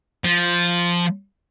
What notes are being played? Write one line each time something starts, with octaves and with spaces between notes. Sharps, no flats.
F3